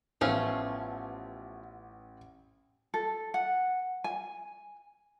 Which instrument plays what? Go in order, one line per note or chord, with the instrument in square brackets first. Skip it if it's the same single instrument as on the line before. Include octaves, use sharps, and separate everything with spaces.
[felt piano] A1 B3 F6 [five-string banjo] F3 A3 C#4
[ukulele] A4
F#5
G#5